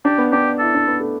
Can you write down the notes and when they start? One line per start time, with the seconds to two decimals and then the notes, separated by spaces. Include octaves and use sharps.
0.05 D4 G4
0.18 B3
0.32 D4 G4
0.59 E4 A4
0.74 D4
0.88 B3
1.00 A3